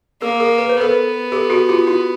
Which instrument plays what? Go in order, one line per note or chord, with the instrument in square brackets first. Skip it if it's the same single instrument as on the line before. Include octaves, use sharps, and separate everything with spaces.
[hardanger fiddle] A#3 [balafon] G#4 A#4
[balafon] G#4 A#4
B4
C5
[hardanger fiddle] B3 [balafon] A4 B4
[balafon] G4 A4
F#4 G#4
F4 G4
E4 F#4